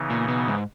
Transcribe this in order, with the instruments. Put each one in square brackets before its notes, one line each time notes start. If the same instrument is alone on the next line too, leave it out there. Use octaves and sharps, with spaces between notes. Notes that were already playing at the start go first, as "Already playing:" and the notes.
Already playing: [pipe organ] C#3 E3 B3 D#4
[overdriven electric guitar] A#2
B2
G#2